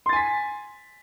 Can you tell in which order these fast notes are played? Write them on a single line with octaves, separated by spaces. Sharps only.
C6 A6 G#5 B6